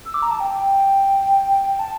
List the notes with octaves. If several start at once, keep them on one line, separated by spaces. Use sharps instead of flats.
E6
D6
A#5
A5
G5
A5